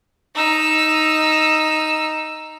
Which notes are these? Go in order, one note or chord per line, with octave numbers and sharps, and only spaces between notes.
D#4 E6